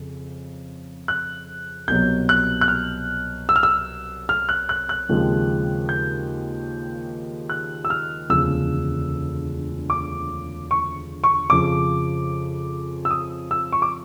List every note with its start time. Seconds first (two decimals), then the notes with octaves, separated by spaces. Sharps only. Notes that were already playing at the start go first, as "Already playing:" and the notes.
Already playing: F2 C#3
1.08 F#6
1.88 C2 B2 F#3 G6
2.29 F#6
2.61 F#6
2.68 F6
3.49 E6
3.56 F6
3.63 E6
4.29 F6
4.49 F#6
4.69 F#6
4.89 F#6
5.09 D#2 C#3 F3 G#3 C4
5.89 G6
7.50 F#6
7.85 E6
7.90 F6
8.29 E1 D2 C#3 F3 E6
9.90 D6
10.71 C#6
11.24 C#6
11.50 F2 C#3 F3 D6
13.05 E6
13.11 D#6
13.51 E6
13.72 C#6
13.82 D6